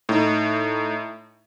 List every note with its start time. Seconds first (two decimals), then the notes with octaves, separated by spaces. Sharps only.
0.09 A2 D#4